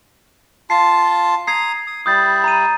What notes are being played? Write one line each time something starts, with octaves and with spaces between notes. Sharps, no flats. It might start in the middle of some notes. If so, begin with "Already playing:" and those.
F4 A5 C7
A#5 D#6 G#6 C7
D#6
G3 E4 D#6 G6 A6
A#5 D#7